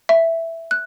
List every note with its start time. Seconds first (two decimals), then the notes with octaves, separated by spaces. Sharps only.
0.09 E5
0.71 F#6